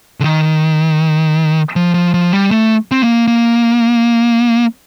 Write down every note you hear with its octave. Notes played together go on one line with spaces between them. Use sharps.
D3
D#3
F3
F3
F3
G3
A3
C4
A#3
A#3